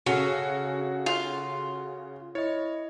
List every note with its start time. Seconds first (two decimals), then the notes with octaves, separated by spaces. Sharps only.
0.06 C#3 C#4 F#4 A4 C7 C#7
1.06 F4
2.35 E4 C#5 D#5